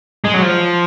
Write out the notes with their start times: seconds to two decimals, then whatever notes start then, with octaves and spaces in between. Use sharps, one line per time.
0.24 G#3
0.34 F#3
0.42 F3